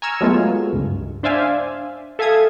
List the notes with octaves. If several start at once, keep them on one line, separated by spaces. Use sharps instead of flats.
G#5 A#5 C#6 E6 F6 G#6
F#3 G#3 A3 B3 F4
C#2 G2
D4 C5 D5 E5 F5 G#5
A4 E5 F5 G#5 D#6 G#6